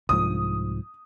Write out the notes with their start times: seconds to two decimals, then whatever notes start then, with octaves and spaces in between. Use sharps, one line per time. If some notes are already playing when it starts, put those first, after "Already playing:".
0.09 C2 G#2 F3 D#6